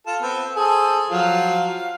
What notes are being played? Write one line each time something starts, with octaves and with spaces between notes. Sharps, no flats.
F4 A4
B3 C4
G#4 A4 C5
F3 F#3 F5
F5